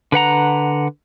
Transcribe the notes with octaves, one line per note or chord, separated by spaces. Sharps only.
D3 B4 F#5 A#5